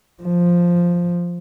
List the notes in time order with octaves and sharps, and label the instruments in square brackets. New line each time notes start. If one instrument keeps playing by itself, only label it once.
[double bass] F3